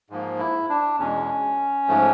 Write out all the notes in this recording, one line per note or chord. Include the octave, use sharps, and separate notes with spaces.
G#2 F3 A#3
E4
D4
E2 B2 G#3 C#4
G#2 F3 A3